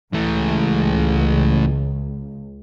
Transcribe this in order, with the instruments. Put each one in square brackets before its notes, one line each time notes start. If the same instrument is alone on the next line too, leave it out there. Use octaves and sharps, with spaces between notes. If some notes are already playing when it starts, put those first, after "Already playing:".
[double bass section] C#2 [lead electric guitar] E3 A3